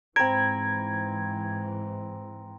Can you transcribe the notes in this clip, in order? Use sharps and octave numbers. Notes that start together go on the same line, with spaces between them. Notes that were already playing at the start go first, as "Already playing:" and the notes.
G#2 E3 C4 A#5 B5 G#6 A#6 D7